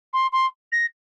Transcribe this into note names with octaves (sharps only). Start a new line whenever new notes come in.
C6
C6
A#6